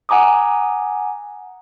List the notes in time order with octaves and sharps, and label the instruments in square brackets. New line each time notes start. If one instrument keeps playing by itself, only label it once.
[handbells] F#5 G#5 A#5 D6 D#6